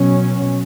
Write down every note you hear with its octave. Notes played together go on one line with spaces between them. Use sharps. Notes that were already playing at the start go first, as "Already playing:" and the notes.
Already playing: B2 F#3 C#4